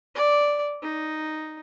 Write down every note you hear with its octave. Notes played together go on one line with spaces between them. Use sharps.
D5
D#4